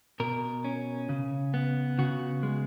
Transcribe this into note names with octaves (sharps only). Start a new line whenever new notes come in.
B2 A#4
C#4
C#3
B3
C#3 F#4
G#3